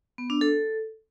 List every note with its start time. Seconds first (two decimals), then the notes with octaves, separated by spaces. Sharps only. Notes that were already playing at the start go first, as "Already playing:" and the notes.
0.18 B3
0.30 D4
0.41 A4